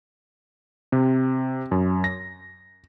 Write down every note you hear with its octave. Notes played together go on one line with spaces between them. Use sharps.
C3
F#2
A#6